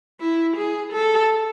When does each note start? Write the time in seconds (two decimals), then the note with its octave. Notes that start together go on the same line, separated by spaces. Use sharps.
0.20 E4
0.57 G#4
0.93 A4